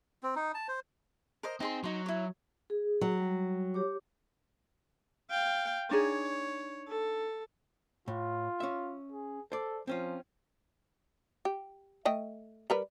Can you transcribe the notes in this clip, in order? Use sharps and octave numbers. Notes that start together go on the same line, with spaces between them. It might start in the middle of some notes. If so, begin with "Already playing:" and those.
C4
D#4
A5
C5
A#4 C5 D#5
C4 D#4 G#4 C6
F#3 D#4 C6
E4 C#5
G#4
F#3
G3
G4 C#5 D6
F5 G5
D4 D#4 G#4 C#5
A4
A2 F4
C#4 E5
G#4
A4 C5 D5
F3 C4 C#4 F4
G4
A3 D#5 G5
G3 A#4 B4